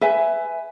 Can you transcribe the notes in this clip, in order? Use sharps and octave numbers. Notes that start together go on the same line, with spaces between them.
B4 E5 G#5